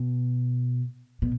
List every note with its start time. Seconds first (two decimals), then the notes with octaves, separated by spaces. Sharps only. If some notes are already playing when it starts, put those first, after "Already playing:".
Already playing: B2
1.22 B2